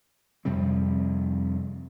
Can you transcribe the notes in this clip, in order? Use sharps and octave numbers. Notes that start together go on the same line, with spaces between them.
F2 C3 G3 C4